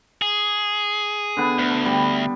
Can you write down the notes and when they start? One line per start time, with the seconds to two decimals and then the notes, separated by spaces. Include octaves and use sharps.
0.22 G#4
1.37 D3 B3
1.59 D2
1.86 G3